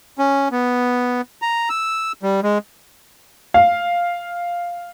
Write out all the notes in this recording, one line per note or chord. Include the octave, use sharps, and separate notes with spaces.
C#4
B3
A#5
E6
G3
G#3
F5